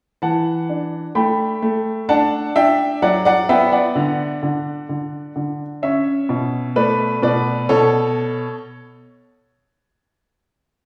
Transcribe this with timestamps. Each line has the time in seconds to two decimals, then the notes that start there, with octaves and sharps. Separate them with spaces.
0.22 E3 F#5 A5
0.69 D4
1.15 A3 G5 B5
1.62 A3
2.09 D4 F#5 A5
2.56 D4 E5 G5
3.02 F#3 D5 F#5
3.25 D5 F#5
3.49 B3 E5 G5
3.72 D5 F#5
3.96 D3
4.43 D3
4.89 D3
5.36 D3
5.83 C#4 C#5 E5
6.29 B2
6.76 A3 B4 D5
7.22 B2 B4 D5
7.69 B2 A4 C#5